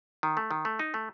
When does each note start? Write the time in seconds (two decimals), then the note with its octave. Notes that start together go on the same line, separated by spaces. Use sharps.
0.23 D#3
0.37 A3
0.51 D#3
0.65 A3
0.79 D#4
0.94 A3